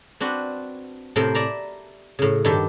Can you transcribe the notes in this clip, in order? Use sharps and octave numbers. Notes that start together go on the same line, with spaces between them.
C4 D4 F#4 B4
A2 C3 A4 A#4 C5 B5
D5 E5 A#5 B5
A2 C#3
G2 D#3 G4 A4